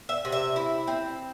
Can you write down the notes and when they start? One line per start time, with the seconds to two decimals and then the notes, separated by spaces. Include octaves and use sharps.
0.09 E5
0.25 C3
0.32 E5
0.56 E4
0.88 C4